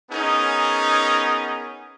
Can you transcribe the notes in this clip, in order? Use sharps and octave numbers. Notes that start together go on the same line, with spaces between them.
B3 C#4 D#4 G#4 A#4